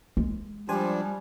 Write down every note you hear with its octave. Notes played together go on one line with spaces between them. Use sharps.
G#3
F3 G3 D4 G4 C5 G#5